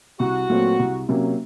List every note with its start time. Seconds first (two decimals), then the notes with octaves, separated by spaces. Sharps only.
0.19 C2 F#4
0.49 A#2 F#3 A3 C4
0.79 C2
1.09 C3 F#3 A#3 C#4